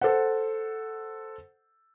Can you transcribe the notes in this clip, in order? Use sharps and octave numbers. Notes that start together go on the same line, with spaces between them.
A4 C5 F#5